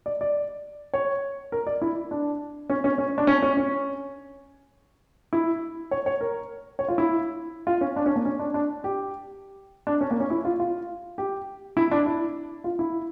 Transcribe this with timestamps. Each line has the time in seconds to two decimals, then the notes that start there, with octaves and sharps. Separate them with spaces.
0.06 D5
0.21 D5
0.94 C#5
1.52 A#4
1.67 D5
1.82 E4
2.11 D4
2.70 C#4
2.84 C#4
2.98 C#4
3.18 D4
3.27 C#4
3.42 C#4
3.57 C#4
5.33 E4
5.91 C#5
6.06 C#5
6.21 A#4
6.79 C#5
6.88 F4
6.98 E4
7.67 F4
7.81 C#4
7.96 D4
8.06 C#4
8.16 A#3
8.25 C#4
8.40 D4
8.54 D4
8.84 G4
9.87 D4
10.01 C#4
10.11 A#3
10.20 C#4
10.30 E4
10.45 F4
10.60 F4
11.18 G4
11.77 E4
11.91 D4
12.06 E4
12.64 F4
12.79 E4